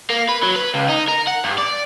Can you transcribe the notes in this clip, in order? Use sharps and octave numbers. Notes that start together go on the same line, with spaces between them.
A#3
B4
F#3
B4
C#2
D#4
A#4
F#5
G2
D5